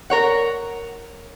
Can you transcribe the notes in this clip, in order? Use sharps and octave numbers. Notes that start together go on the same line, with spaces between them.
A#4 C#5 F#5